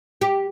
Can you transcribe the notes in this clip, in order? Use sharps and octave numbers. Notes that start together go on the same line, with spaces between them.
G4